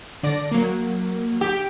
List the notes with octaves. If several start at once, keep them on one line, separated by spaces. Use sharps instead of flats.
D3 D5 A#6
F#3 A#3
G4